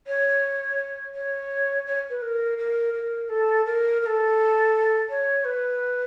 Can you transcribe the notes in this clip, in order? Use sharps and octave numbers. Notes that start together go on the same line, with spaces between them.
C#5
C#5
C#5
B4
A#4
A#4
A#4
A4
A#4
A#4
A4
C#5
B4